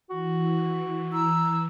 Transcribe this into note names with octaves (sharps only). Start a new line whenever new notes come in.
E3 F#4
A#5 E6